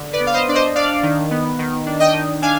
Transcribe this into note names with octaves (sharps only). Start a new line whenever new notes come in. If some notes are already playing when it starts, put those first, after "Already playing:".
Already playing: D3
B4 D5
B3
F5
C5 D#5
D4 D5
C5 D#5
D4 D5 F5
D#3
B3
D#3
D4
D#5 G5
D#3
D4 F5 G#5